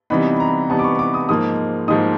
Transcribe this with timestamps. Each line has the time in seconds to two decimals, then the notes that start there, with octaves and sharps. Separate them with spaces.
0.10 C3 E3 G3 B3 D#4 B5
0.40 A#5
0.69 C3 E3 G3 B3 D#4 A5
0.79 D6
0.84 C#6
0.99 D6
1.14 D#6
1.29 G#2 F3 A#3 D#4 D#6
1.88 G#2 F3 A#3 D#4 D#6